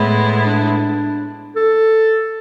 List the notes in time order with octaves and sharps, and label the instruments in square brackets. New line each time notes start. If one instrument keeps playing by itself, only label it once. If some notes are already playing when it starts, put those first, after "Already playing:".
Already playing: [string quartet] A2 G#3 B3 E4
[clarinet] D4
A4